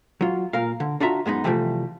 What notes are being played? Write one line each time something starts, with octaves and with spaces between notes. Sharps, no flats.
F#3 F4
A#2 A#4 F5
D3
D4 F4 F#4 E5 A#5
F#2 G#3 B3 D#4
C3 E3 F3 G3 A3